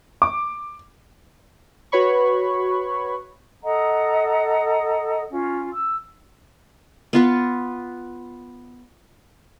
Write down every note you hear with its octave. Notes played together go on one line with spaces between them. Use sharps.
D6
F#4 B4 C#5 B5 C#6
A4 D#5 F#5 A#5
C#4 F4
E6
B3 F4 B4